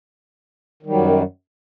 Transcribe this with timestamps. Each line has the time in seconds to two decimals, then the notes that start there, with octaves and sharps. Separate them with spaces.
0.83 D#3
0.86 G3
0.90 F#3
0.93 F#2